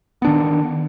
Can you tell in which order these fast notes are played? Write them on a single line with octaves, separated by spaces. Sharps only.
B3 D4 D#3